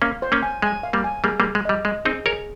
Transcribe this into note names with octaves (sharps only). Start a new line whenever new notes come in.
A#3 C#4 F5
C5
A#3 C#4
G#5
G#3 G#5
F5
G3 A#3
G#5
G3 A#3 G#4
G3 A#3
G#4
G#3
G3 D#5
G#3 D#5
C4 D#4 G#4
G#4 A#4 C#5